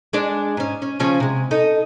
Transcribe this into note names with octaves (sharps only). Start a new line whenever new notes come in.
G#3 D4 D5
G#2 C#4
C#4
C#3 F3 C#4
C3 G#3
D#4 A4